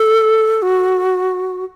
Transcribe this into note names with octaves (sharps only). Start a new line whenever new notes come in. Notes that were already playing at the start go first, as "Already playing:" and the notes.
Already playing: A4
F#4